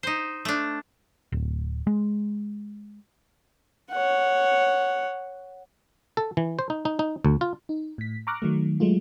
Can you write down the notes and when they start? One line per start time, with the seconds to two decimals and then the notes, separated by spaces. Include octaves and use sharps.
0.03 D#4 C5
0.45 A3 D4
1.32 D1
1.87 G#3
3.91 C#5 F#5
6.17 A4
6.37 E3
6.59 C5
6.70 D#4
6.85 D#4
6.99 D#4
7.25 D2
7.41 F4
7.69 D#4
7.98 A2 B6
8.27 A#5 C#6 D6 F6 F#6 A#6
8.42 D#3 F#3 A3
8.80 F#3 G#3 A3 F4